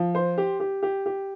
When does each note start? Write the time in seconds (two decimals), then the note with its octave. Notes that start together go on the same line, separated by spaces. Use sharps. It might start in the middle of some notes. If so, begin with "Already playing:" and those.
Already playing: F3
0.15 C5
0.38 G4
0.60 G4
0.83 G4
1.06 G4